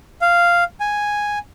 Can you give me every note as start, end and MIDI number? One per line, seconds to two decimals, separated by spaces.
0.22 0.64 77
0.80 1.39 80